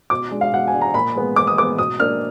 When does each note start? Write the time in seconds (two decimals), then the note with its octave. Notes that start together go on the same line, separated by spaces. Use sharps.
0.10 B2 D6
0.31 G#3 D4
0.41 F5
0.52 B2 F#5
0.68 G#5
0.74 G#3 D4
0.81 A#5
0.94 A#2 B5
1.16 G#3 B3
1.36 A#2 D6
1.47 D#6
1.58 G#3 B3 D6
1.78 B2 D#6
1.99 A#3 D4 F6